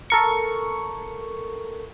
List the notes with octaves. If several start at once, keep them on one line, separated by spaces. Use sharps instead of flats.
A4 A#4 C#6